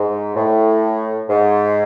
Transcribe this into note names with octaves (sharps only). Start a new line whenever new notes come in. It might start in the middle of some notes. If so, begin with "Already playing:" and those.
Already playing: G#2
A2
G#2